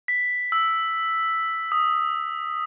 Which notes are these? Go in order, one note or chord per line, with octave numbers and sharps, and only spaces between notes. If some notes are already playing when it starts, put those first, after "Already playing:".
B6
E6
D#6